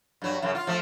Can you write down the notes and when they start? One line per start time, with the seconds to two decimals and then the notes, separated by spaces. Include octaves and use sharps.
0.22 G2 F#3
0.42 F#2 C#3
0.55 F4
0.67 F3 A3